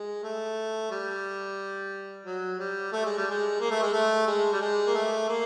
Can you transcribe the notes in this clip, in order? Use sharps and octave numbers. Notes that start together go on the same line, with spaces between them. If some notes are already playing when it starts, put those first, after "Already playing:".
Already playing: G#3
A3
G3
F#3
G3
A3
G#3
G3
G#3
A#3
A3
G#3
A3
G#3
G3
G#3
A#3
A3
A#3